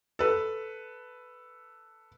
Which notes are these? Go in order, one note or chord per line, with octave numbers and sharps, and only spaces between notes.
A4 B4